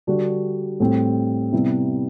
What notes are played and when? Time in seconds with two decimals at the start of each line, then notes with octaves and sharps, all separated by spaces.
0.07 D3 G3 D4 F#4
0.80 A2 G3 C4
1.53 C3 G3 B3 E4